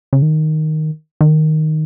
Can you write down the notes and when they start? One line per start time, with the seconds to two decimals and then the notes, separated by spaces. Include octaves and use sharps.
0.13 C#3
0.22 D#3
1.21 D#3